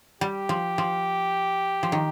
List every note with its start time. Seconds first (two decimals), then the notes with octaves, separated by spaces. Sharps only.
0.21 G3 G4
0.49 F3
0.78 F3
1.83 F3
1.92 D#3